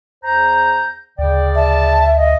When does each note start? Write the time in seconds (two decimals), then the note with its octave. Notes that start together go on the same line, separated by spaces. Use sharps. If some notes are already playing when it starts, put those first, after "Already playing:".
0.24 E2 C5 A#5 G6
1.19 D2 C#3 D5 G5
1.55 E5 A5
2.16 D#5